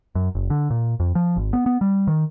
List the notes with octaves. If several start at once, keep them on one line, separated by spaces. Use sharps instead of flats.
F#2
F#1
D3
A#2
F2
F3
G#1
B3
B3
G3
D#3